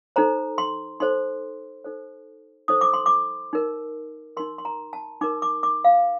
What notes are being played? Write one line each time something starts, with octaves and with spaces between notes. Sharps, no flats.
D#4 A4 C5 A#5
C6
D#4 A4 C5 C6
D#4 A4 C5
D#4 A4 C5 D#6
D6
C6
D6
D#4 A#4
D#4 A#4 C6
C6
A#5
A5
D#4 A#4 D6
D6
D6
F5